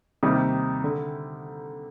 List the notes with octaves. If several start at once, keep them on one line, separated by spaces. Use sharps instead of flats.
C3 D#3 G3 A#3 D#4
D3